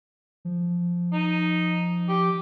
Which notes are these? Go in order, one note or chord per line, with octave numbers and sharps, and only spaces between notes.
F3
D#4
G4